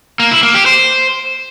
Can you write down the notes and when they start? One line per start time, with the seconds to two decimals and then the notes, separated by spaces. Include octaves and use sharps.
0.20 A#3
0.31 E4
0.43 A#3
0.54 G4
0.66 C5